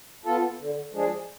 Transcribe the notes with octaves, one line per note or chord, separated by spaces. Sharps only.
B3 F4 A4
D3
F3 G#3 D4 G#4